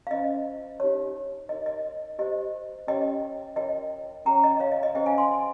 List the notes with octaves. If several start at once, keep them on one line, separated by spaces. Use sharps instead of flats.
F5
C#4 F4 C5 D#5
D#4 G4 C#5
D#4 A#4 C#5 D#5
D#5
G4 C5 D#5
C#4 G4 C#5 D#5 G5
F4 A#4 C#5 D#5 G5
C#4 G#4 C#5 G5 A#5
D#5
C#5 F5
D#5
D#5
C#4 G#4 C5 D#5 G5
F5 G#5
G#5 C6